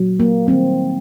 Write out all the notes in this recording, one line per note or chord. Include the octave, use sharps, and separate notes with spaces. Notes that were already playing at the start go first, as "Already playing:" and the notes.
Already playing: A#2 F#3
A#3
D#3 G3 A#3 C4